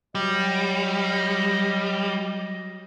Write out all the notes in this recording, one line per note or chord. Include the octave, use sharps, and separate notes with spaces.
F#3 G3 D#5